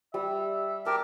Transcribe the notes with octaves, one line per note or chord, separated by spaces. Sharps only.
G3 E5
G4 A#4 A5